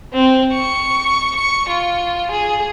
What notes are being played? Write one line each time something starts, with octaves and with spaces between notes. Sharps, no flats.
C4
C#6
C#6
F4
G#4